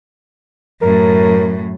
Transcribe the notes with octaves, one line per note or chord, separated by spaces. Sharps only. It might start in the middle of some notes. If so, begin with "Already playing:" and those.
F#2 A2 A#4